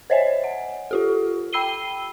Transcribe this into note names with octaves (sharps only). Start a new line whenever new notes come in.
C5 C#5 D#5 E5 G#5
F#5
F4 G4 A4
G5 B5 E6 C7 D#7 G7